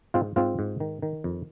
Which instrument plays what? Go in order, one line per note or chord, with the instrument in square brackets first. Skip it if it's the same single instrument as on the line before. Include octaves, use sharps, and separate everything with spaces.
[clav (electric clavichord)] G#2 C4 F4
G#2 C4 F4
G#2
D#3
D#3
F2